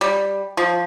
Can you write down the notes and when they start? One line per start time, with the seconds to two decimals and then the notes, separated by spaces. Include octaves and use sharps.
0.01 G3
0.57 F3